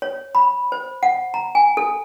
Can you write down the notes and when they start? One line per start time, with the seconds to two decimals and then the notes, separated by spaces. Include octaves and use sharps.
0.02 C#5
0.35 B5
0.72 C5
1.03 F#5
1.34 A#5
1.55 G#5
1.77 A4